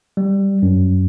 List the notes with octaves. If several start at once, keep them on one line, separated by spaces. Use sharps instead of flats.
G3
F#2